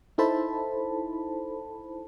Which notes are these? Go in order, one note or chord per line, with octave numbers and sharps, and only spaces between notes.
D#4 E4 A4 C5 A5 B5